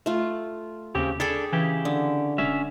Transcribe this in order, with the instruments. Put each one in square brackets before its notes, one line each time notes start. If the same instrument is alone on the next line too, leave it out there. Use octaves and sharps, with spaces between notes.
[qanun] A3 F4
[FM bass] D#2 [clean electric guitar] C#3 C4 G4
[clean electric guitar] D4 A4 [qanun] G#4 G5 B5
[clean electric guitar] C#3 E4 G4 [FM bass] E3
[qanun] D3
[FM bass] E1 [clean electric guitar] C#4 E5